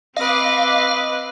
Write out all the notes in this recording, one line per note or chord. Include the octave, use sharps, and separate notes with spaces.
C4 B4 D#5 F5 D6